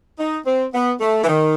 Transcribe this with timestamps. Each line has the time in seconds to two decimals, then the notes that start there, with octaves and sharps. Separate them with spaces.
0.19 D#4
0.46 C4
0.74 B3
1.01 A3
1.23 E3
1.28 D#3